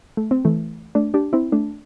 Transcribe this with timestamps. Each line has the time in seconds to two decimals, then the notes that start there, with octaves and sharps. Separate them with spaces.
0.17 A3
0.31 C4
0.45 E3 A3
0.95 A3 D4
1.14 D4 G4
1.33 C4 E4
1.52 A3 D4